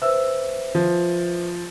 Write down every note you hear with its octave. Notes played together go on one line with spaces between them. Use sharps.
B4 C5 E5 E6
F3